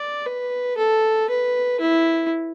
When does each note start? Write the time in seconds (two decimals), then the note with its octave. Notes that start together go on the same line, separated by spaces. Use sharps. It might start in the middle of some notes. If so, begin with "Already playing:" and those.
Already playing: D5
0.26 B4
0.77 A4
1.29 B4
1.80 E4